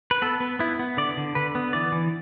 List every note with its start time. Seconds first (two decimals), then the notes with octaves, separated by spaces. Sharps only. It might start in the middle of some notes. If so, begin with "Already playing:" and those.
0.11 B4
0.22 B3 A4
0.40 B3
0.59 B3 E4
0.79 B3
0.97 D3 D5
1.17 D3
1.35 D3 B4
1.55 B3
1.73 E3 D5
1.92 E3